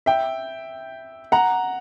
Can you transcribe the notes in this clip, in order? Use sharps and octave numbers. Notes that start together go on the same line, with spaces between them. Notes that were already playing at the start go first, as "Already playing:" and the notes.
E5 G5
F#5 A#5